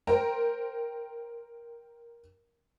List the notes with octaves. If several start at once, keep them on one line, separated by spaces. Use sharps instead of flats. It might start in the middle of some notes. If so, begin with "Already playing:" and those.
A#4 C5 G5 A#5